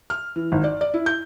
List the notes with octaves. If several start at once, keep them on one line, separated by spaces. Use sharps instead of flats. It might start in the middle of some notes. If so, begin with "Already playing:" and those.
F6
E3
G#1
D5
D5
E4
G6